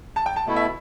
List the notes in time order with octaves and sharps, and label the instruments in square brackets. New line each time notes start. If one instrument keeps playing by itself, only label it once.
[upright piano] A5
G5
A5
[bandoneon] B2 A3 E4
[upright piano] E5